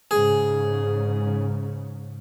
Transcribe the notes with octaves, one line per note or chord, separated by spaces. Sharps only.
G#2 C#3 G#4